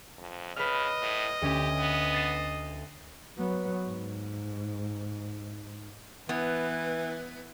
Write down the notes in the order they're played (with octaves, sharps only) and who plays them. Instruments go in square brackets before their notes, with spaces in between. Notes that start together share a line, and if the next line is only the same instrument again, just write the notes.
[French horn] F2
[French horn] C#3 [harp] B4 F6 [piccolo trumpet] D#5
[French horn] A2
[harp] D2 C#4 [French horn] G4
[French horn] B3
[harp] A6 C7 E7
[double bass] F#3 B3
G#2
[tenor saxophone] E3 [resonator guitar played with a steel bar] B3